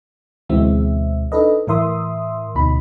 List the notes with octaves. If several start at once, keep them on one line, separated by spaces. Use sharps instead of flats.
D2 B2 E3 G#3 C4 E5
D4 D#4 A4 B4 D#5
A2 E3 A#4 E5 C6 D#6
D2 B2 D#4 B5